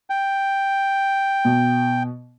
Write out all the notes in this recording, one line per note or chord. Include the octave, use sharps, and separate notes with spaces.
G5
B2